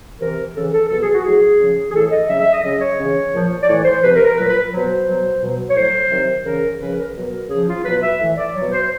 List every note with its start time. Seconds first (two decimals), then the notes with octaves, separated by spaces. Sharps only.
0.20 C3 E3 A#4
0.55 C#3 E3 A4
0.72 A4
0.89 B2 F#3 A4
1.01 G#4
1.13 F#4
1.24 A2 F#3 G#4
1.60 C#3 F3
1.89 G#4
1.94 A2 E3 A4
2.11 D#5
2.28 C#3 F#3 E5
2.40 E5
2.52 D#5
2.63 C#3 F#3 D#5
2.81 C#5
2.98 C#3 E3
3.32 A#2 F3
3.62 D5
3.68 A2 E3 C#5
3.84 C5
4.02 C3 F3 B4
4.14 A#4
4.25 A#4
4.37 A#2 F#3 B4
4.48 B4
4.71 B2 F#3 C5
5.07 B2 F#3
5.41 B2 F#3
5.70 C#5
5.76 A2 F#3 C5
6.11 C3 D#3 F#3
6.45 C#3 E3 A#4
6.80 C#3 F3 B4
6.98 A#4
7.15 B2 F#3
7.49 C#3 F3 G#4
7.67 F4
7.84 B2 F#3 B4
8.02 E5
8.19 A2 E3 E5
8.37 D5
8.54 B2 F#3 C#5
8.71 C5